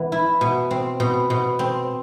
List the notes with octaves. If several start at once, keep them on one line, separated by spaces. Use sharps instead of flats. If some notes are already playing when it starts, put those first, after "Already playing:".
Already playing: E3 B3
E4
B2
C4
B2
B2
C4